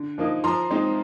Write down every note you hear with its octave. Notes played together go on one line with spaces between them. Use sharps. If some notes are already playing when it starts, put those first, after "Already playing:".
Already playing: D3
F3 A#3 D#4
F3 A#5 C6
G#3 C4 D#4